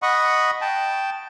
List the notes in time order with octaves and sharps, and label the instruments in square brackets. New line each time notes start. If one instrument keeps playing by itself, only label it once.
[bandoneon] D#5 F#5 B5 C#6 D#6
G5 A5